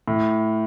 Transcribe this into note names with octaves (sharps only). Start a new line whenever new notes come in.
A2